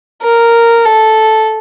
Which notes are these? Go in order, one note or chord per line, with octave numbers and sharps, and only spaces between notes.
A#4
A4